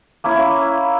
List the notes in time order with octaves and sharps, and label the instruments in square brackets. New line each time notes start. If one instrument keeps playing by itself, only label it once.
[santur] A#3 C#4 E4